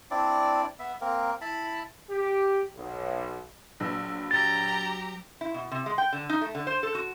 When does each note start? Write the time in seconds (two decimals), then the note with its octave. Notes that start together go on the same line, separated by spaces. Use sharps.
0.11 C4 D4 E4 D5
0.79 B3 E5
1.01 A#3 C4 A#4
1.41 E4 A5 B5
2.11 G4
2.76 B1
3.80 A#1 F#3 B4 E6
4.31 G4 A#5 A6
5.41 E4
5.54 B2
5.71 C3
5.86 G#3
5.98 G5
6.13 D3
6.29 D#4
6.41 A3
6.55 D3
6.67 C5
6.83 A4
6.95 F#4